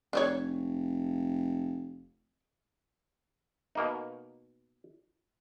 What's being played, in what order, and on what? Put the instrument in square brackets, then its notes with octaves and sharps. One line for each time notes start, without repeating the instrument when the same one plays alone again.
[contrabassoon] F1 [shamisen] D4 C5 C#5
[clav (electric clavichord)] B2 A#3 D#4